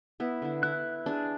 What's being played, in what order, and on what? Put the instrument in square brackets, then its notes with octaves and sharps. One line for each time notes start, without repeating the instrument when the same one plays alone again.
[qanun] B3 E4
D3 E4
[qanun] E4 [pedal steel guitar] F#6
[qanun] D4 G#4